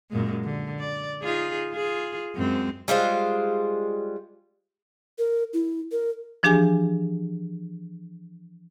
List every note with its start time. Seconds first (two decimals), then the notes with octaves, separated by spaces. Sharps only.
0.11 F#2 A#2 G#3
0.45 D3
0.80 D5
1.22 D#4 F4 G#4
1.72 F4 G#4
2.36 F#2 G#3 C4
2.88 G3 G#3 F4 C5
5.19 A#4
5.53 E4
5.92 A#4
6.43 E3 F3 D4 G4 G#4 G#5